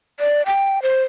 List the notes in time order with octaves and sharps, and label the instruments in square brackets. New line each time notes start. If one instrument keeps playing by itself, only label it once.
[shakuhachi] D5
G5
C5